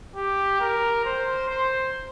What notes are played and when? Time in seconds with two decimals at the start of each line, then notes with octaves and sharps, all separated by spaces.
0.16 G4
0.60 A#4
1.05 C5
1.49 C5